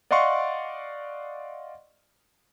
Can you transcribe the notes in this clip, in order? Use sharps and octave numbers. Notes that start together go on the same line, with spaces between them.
D5 D#5 F5 F#5 C6 C#6